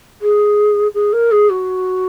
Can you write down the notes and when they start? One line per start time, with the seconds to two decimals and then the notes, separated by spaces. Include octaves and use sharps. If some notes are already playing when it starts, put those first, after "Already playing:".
0.22 G#4
0.94 G#4
1.13 A#4
1.32 G#4
1.50 F#4